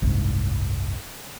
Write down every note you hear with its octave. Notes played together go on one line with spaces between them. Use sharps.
F#1 C2 G#2